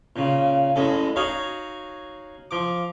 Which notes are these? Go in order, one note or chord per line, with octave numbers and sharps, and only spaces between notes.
A#2 C#3
A1 F#2 G#3 A4
D#4 F#4 G#4 C#5 F5
F3 D6